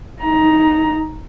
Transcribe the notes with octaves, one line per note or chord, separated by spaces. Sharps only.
D#4 A#5